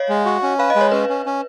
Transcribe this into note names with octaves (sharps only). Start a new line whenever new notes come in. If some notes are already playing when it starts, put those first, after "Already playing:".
Already playing: C#5 D#5 F5
G#3
F#4
C#4
B4 F5
D#5
G#3
C#5
C#4 B4
C#4
C#4